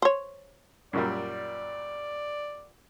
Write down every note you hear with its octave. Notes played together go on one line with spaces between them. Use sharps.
C5 C#5
F#2 A#2 G3 D5